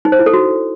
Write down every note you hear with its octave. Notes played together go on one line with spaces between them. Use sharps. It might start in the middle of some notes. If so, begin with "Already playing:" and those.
D#4
C5
E4
A4
F#4